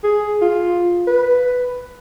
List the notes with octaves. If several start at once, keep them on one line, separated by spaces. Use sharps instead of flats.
G#4
F4
B4